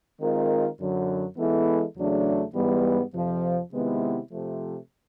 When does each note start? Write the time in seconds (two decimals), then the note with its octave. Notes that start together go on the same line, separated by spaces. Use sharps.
0.21 D#3 G#3 C4 F4 A#4
0.79 F#2 D3 F#3
1.38 E3 G#3 B3 E4 A4
1.96 E2 C#3 F#3 A3 D4
2.54 G#2 E3 G3 B3
3.12 F2 C3 F3
3.72 C3 D#3 G#3 B3 E4
4.30 C3 F3 A3